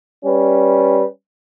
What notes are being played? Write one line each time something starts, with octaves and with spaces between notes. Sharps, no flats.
G3 C#4 B4